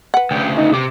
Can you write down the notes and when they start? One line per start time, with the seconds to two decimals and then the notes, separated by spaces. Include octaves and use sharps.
0.14 B4 F#5
0.31 D2 C#3 G5
0.57 D#4
0.73 C3 D6